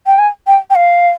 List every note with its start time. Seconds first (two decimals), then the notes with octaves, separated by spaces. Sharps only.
0.06 G5
0.18 G#5
0.47 G5
0.70 G5
0.75 F5